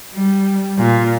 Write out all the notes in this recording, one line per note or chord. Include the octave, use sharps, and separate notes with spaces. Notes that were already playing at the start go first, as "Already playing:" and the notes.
G3
A#2